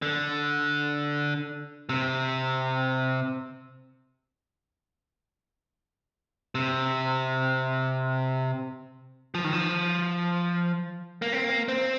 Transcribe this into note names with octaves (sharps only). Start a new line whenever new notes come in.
D3
C3
C3
F3
D#3
F3
A#3
C4
A#3
C4